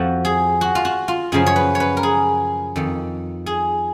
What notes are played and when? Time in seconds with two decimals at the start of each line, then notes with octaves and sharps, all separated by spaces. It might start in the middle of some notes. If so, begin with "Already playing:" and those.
Already playing: F2 F3 F#4
0.25 G#4
0.61 F#4
0.75 F4
0.85 F#4
1.08 F4
1.32 F#2 C#3 F3 G#4
1.46 C#5
1.56 B4
1.75 C#5
1.80 B4
1.97 A#4
2.03 G#4
2.76 F2 D#3
3.46 G#4